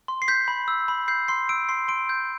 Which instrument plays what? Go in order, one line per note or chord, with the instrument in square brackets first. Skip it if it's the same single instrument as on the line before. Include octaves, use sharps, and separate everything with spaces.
[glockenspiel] C6
C7
G6 B6
B5
E6
B5
G6 C7
C6 C7
E6 D7
C6 C7
C6 D7
G6